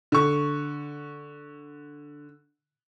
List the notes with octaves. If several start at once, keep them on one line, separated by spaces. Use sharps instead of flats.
D3 C#6